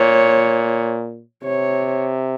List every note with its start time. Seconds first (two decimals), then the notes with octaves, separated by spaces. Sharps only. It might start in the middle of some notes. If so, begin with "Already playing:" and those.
Already playing: A#2 C#5
1.43 C3 C#5